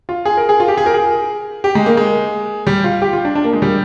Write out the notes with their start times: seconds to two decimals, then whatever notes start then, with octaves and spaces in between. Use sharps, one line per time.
0.09 F4
0.25 G#4
0.37 A#4
0.49 G#4
0.60 F4
0.68 G4
0.77 G#4
0.86 A#4
0.94 G#4
1.64 G4
1.75 G#3
1.86 A#3
1.97 G#3
2.67 G3
2.84 F4
3.02 G4
3.13 F4
3.25 D4
3.35 D4
3.44 A#3
3.53 G#3
3.62 G3